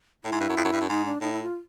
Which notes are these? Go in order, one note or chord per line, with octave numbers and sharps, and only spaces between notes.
A2 E4
G#2
G2
F#2
F2
F#2
G2
F#2
G#2 D#4
D4
A2 D#4
E4
F4